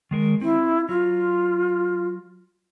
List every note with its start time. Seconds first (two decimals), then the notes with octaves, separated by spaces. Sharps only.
0.11 D#3 G#3 A#4
0.41 C4 E4
0.89 F#3 F4